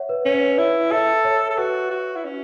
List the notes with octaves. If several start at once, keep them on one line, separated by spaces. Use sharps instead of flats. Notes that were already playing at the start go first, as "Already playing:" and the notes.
Already playing: C#5 E5 F#5
B4
C#4 B4
C#5
B4
E4 C#5
A4 E5
C#5
A4
F#4 B4
F#4
E4
C#4